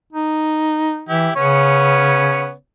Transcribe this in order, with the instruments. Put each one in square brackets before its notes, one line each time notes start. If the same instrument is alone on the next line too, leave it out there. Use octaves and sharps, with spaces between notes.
[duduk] D#4
[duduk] E3 [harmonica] E4 G4
[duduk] C#3 [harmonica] B3 C#4 C#5